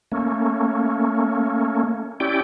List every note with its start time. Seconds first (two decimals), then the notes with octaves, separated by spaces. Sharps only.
0.12 A3 A#3 C#4
2.20 C#4 E4 G4 D5 G5